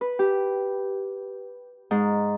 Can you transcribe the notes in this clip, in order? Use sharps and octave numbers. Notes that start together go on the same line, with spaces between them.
B4
G4
G#2